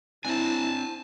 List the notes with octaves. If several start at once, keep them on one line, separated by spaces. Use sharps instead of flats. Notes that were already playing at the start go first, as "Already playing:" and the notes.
C4 D4 E4 G#5 A5